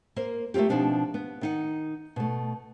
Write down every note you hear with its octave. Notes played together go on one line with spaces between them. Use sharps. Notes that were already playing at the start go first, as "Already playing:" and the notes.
A#3 A#4 C5
A3 A#3 C4 F4 G4
B2 F3 C4 D4 D#4
B3
D#3 D#4 F#5
B2 A3